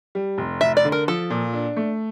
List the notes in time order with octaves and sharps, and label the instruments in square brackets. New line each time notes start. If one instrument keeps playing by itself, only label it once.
[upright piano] G3
F1
[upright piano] F1 [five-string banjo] E5
[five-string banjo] D5
[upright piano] D3
[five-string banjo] A#4
[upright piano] F3 [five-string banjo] A4
[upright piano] A#2
D4
A3